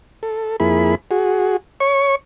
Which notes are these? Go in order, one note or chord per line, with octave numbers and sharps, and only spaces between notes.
A4
F2 A#3 E4 G#4 B5
F#4 G#4
C#5 C#6